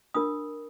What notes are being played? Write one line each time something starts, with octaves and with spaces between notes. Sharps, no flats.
D4 F4 A#4 D#6